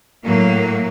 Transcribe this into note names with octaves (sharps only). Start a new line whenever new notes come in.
A2 F#3 A#3